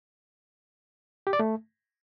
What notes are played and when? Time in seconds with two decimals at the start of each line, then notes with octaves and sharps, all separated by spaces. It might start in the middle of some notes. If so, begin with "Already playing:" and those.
1.27 G4
1.33 D5
1.39 A3